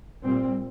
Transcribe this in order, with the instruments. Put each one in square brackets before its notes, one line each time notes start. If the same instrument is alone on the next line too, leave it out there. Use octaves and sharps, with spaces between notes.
[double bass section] A#2 G3 C4